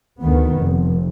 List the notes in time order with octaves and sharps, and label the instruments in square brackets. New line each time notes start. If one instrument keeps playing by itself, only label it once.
[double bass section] D2 D#3 B3
F1